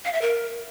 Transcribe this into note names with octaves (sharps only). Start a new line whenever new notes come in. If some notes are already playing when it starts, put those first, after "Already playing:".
F5
E5
A#4